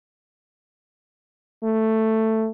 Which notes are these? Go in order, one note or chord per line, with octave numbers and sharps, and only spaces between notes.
A3